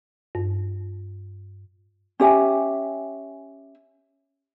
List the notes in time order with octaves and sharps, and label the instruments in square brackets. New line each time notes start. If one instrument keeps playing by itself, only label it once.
[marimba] G2
[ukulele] C#4 G4 E5 G#5